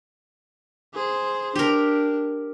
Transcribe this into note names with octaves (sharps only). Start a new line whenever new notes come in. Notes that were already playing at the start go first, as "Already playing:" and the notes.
G#4 C5
D4 G4 A#4